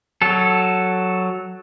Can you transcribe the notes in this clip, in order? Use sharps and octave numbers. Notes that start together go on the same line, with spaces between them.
F#3 A4